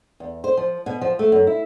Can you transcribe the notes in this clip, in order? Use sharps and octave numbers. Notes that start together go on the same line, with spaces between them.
E2
C5
F3
B2
F3
A3
F#2
E4